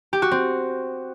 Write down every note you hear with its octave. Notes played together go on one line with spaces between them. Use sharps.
G4
F#4
C4